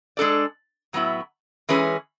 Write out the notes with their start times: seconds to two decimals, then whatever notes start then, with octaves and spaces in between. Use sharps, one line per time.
0.17 G#3 D4 A4 D5
0.93 A2 F#3 B3 E4
1.69 E3 G#3 C#4 G#4 B4